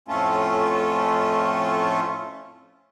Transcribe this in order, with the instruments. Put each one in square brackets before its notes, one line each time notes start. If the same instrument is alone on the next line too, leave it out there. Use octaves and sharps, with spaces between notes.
[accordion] F2 A2 A3 C#4 F4 A4